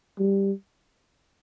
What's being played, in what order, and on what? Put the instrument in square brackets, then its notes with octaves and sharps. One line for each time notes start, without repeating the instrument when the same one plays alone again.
[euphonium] G3